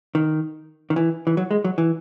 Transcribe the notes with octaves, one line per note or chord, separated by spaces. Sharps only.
D#3
D#3
E3
E3
F#3
G#3
F#3
E3